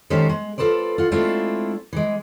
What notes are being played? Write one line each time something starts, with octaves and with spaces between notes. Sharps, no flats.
D#3 G#3 C#4 G4 A4 C5
G#3
F4 A4 B4 C5 D5
F4 F#5
G#3 A3 C4 D4 E4 F4
E3 G#3